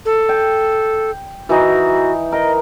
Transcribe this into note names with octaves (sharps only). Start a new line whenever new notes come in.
A4
G5
E3 D#4 F#4
A#4 D#5